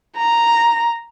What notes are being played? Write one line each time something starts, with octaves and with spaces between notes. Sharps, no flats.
A#5